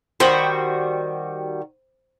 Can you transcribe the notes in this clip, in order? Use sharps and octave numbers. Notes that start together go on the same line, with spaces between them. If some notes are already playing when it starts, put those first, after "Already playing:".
D#3 G3 F#4 C5 G5 B5